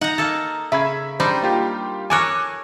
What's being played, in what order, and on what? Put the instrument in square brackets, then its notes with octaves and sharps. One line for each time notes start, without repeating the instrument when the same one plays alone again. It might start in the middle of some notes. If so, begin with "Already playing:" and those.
[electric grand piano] D#4 [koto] F#5 A#5
[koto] A#3 A4
[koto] C#3 [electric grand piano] E5 B5 G#6
[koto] G3 D4 D#4 [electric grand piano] C5 B5
[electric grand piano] A#3 F4 G4
[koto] A4 A#4 C#5 [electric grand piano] G#5 D6 F#6